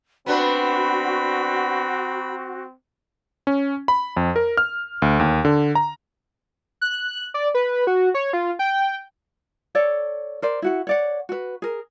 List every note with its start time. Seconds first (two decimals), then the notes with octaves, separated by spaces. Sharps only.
0.26 B3 C4 D4 F#4 B4 B5
3.47 C#4
3.88 B5
4.17 F2
4.36 A#4
4.57 F6
5.02 D2
5.19 D#2
5.45 D3
5.75 A#5
6.81 F#6
7.34 D5
7.54 B4
7.87 F#4
8.14 C#5
8.33 F4
8.59 G5
9.75 A4 C#5 D5
10.42 A#4 C5 D5
10.62 E4 F#4 F#5
10.87 C#5 D5 F#5
11.29 F#4 B4
11.62 G#4 A#4